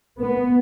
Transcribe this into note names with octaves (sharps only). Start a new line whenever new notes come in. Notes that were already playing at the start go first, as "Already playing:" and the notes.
B3